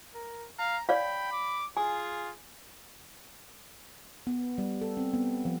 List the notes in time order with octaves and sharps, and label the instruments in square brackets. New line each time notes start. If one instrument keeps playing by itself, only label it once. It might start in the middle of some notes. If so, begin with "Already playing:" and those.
[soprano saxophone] A#4
[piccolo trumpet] F5 [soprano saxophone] A#5
[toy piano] C#5 D5 F5 [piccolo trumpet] G5 [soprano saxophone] B5
[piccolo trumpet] D6
[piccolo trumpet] F4 [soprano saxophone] G#4 [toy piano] G#5
[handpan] B3
G3
A4
C4
B3
F3